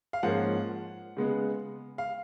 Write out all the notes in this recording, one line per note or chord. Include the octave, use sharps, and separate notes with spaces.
F5
G#2 F3 A#3 C#4 F#5
C#3 G#3 B3
F5